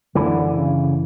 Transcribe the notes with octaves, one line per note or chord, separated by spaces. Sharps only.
F#2 D3 E3
C#3